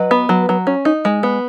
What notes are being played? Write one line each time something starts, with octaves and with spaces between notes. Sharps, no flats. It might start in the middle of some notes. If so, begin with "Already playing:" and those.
Already playing: F#3 B4 D#5
B3
F#3
F#3
C#4
D#4
G#3
B3